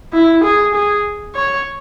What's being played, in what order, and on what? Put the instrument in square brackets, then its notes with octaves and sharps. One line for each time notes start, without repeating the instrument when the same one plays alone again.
[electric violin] E4
G#4
G#4
C#5